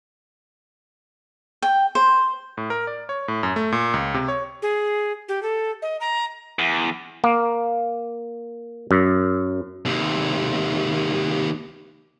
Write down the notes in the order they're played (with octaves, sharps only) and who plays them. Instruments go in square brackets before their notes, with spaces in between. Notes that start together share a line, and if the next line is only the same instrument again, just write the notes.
[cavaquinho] G5
C5
[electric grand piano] A2
A#4
D5
C#5
A2
F#2
A3
A#2
C#2
C3
C#5
[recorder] G#4
G4
A4
D#5
A#5
[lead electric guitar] E2
[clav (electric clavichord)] A#3
F#2
[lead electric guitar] D#2 C3